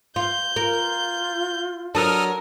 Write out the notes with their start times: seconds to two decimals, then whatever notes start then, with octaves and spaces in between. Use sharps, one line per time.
0.16 F4 G6
0.56 F4 A#4
1.95 F#3 D4 A4 A#4 D#6 F6